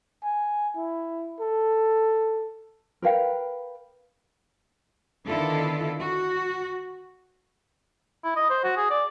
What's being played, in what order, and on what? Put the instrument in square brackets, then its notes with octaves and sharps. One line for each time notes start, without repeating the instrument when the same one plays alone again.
[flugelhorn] G#5
E4
A4
[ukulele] A#4 B4 F5 G5
[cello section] D3 D#3 B3 E4 F4 A4
F#4
[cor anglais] E4
D#5
C5
F#4
G#4
D5